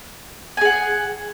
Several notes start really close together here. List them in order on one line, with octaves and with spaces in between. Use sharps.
G#5 G#4 F#5